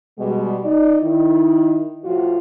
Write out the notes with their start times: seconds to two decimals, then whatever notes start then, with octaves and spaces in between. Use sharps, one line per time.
0.18 B2 G3 G#3
0.63 D#4 D5
1.01 D#3 E4
2.03 A2 F3 F4 F#4